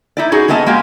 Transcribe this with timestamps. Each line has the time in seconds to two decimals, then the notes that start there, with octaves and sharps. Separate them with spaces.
0.17 D#4 E4 D5
0.32 D#4 F#4 G#4
0.48 G3 A#3 B3 D#5 A5
0.66 G#3 A#3 G4 F5